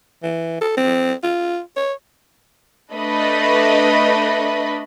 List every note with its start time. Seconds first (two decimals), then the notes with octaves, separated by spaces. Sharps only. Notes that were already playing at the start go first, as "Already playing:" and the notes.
0.23 E3
0.61 A4
0.77 C4
1.23 F4
1.76 C#5
2.93 A3 D4 B4 D#5 B5